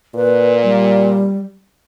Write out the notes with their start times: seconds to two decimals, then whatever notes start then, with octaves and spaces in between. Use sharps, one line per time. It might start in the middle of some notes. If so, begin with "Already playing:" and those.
0.15 A#2 B4
0.63 G3